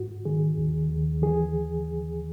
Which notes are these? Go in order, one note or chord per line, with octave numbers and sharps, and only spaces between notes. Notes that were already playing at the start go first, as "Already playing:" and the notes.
Already playing: G#2 F#4
D#3 G#4
D#2
D#2
E3 G#4